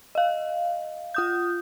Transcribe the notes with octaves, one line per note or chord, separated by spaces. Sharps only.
D#5 F5
F4 D#6 G6